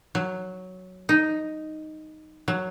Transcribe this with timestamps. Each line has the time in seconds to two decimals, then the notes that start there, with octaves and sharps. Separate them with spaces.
0.15 F#3
1.09 D#4
2.48 F#3